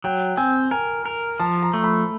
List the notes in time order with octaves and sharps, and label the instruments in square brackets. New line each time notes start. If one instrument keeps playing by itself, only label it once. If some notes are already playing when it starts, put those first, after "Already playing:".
[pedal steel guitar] F#3 [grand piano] G5
[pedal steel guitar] C4 [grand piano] G#5
[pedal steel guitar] A#4 [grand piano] G#5
[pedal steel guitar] A#4
[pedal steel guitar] F3 [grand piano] A5
[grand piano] A#5
[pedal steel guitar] A3
[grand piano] B5